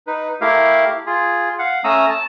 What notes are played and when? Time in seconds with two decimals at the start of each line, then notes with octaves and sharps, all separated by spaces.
0.07 D#4 B4
0.41 A3 E4 G4 A#4 F5
1.06 F4 G#4
1.59 F5 F#5
1.84 A3 C#4 A#5 D#6 E6
2.10 A5